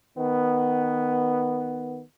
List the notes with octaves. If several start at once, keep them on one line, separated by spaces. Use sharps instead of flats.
D#3 B3